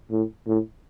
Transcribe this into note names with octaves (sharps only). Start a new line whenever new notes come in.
A2
A2